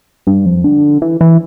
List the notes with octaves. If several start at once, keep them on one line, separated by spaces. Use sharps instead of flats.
G2
F2
D3
E3
E3